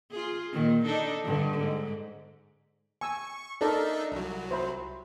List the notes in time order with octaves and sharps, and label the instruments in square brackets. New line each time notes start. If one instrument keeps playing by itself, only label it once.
[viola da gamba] F4 G#4
A#2 D#3
D4 D#4 A4
G2 D3
G#2
[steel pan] G#5 E6 [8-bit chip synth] C#6
[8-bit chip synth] D4 D#4 E5 [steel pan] A4 A#4 D5
[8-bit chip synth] C2 F#3
[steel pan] C5 E5 B5